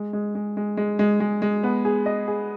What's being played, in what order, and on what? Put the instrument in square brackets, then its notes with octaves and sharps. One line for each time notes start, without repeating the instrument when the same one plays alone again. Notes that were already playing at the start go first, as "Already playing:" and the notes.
Already playing: [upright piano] G#3
G#3
G#3
G#3
G#3
G#3
G#3
G#3
B3
G#4
D#5
G#4